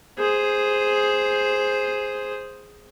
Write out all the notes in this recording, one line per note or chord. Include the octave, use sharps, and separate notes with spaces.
G#4 C5